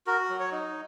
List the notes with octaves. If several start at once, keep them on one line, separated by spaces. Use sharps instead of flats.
F#4 A#4
F#3
C#5
D#4